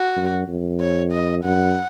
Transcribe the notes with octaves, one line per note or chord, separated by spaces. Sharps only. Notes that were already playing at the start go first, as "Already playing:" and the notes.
Already playing: F#4
F#2
F2
C#5
D#5
F#2 F#5